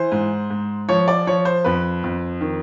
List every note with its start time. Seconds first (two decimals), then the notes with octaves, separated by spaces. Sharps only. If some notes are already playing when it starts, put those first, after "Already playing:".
Already playing: E3 C5
0.12 G#2
0.50 G#2
0.89 F3 C#5
1.08 D5
1.27 F3 C#5
1.45 C5
1.64 F2 B4
2.04 F2
2.41 D#3